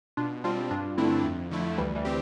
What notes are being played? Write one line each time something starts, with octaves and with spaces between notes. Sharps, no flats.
B2 D4 F4
G3 C4 D4 F4
G2 D4 F4
D3 A3 C4 D4 E4
F2
D3 F3 A3 E4
D2 E3 G3
E3 G3
C4 G4